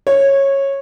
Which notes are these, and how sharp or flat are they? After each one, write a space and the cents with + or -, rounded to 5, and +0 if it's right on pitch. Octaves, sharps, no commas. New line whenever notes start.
C#5 -15